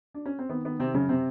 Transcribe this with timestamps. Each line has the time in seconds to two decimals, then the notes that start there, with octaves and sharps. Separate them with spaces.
0.14 D4
0.26 C#4
0.39 C4
0.49 D#3 B3
0.65 D#3 B3
0.79 C3 D#3 C4
0.94 F#2 C#3 C#4
1.09 C3 C4